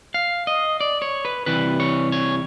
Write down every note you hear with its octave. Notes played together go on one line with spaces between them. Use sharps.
F5
D#5
D5
C#5
B4
C3 E3 G3 B4
C#5
C#5